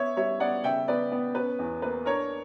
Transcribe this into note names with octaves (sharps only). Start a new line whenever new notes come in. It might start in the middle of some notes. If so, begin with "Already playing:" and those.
Already playing: B3 C#5 E5
G3 C#5 E5
B3 D5 F#5
C#3 E5 G5
B3 B4 D5
B3
C#4 B4
E2
A#3 B4
D4 A#4 C#5